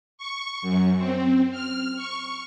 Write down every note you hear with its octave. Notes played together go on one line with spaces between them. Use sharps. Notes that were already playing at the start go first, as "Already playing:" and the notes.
C#6
F#2
C4
F6
C#6